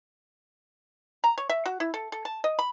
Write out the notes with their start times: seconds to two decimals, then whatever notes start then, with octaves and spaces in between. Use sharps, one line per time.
1.24 A#5
1.38 C#5
1.49 E5
1.66 F#4
1.80 E4
1.94 A4
2.12 A4
2.25 A5
2.44 D#5
2.59 B5